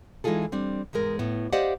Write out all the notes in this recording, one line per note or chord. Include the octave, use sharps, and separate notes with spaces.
E3 G#3 D#4 F4 G#4 A4
G3 C4 D4
E2 G#2 G#3 A#4
A2 B3
G4 C5 D5 D#5 F5 F#5